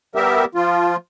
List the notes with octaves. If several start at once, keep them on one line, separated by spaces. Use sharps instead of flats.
G3 B3 G4 A#4 E5
F3 F4